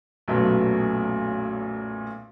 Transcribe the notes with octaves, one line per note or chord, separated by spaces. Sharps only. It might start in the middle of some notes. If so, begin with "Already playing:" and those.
B1 F#2 A#2 F#3 A3 B3